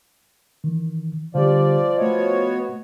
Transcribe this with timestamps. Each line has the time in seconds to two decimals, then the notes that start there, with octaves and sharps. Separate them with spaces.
0.64 D#3 E3
1.35 D3 F3 G3 G4 D5
1.98 A3 B3 F#4 C#5 D#5